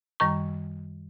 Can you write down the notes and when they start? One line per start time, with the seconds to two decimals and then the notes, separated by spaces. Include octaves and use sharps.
0.20 F#2 D#3 G3 C#6